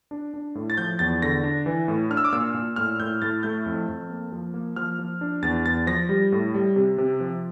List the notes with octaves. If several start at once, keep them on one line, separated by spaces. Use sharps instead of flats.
D4
D4
A2
A6
F3 G6
E2 A6
D3 A#6
D4
E3
A2
D4 F6
E6
D6
A#2 E6
A#2
A2 F6
A2 G6
A2 A6
A3 G6
F2
F2
A#3
F3
A#3
F3 F6
F3
D4
E2 A6
E2 A6
F3 A#6
G3
A2
G3
C3
C3
F3